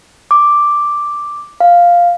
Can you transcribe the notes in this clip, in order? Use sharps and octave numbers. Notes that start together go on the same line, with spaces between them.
D6
F5